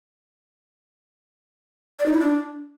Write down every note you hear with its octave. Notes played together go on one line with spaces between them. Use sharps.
D5
D#4
E4
D4